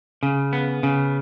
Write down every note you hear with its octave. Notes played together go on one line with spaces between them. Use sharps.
C#3
B3
C#3